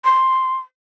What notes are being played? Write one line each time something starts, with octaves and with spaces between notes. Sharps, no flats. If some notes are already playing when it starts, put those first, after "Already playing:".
C6